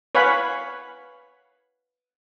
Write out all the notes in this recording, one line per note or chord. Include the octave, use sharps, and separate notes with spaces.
B4 C#5 F5 F#5 G#5 B5